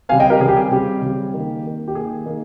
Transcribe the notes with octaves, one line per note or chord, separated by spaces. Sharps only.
C#3 G3 C4 F5 G#5
D#5 G5
G4 A#4
C#3 G3 C4 G#4
G4
G#4
C#3 G3 C4 G4
C#3 G3 C4
D#3 A#3
D#3 A#3
G4
D#3 A#3 G#4
D#3 A#3